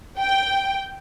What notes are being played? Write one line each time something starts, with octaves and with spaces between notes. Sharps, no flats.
G5